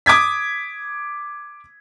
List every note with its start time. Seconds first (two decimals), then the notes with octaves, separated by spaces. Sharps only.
0.06 D6 D#6 G#6 B6